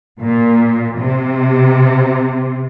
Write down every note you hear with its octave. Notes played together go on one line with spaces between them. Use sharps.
A#2
C3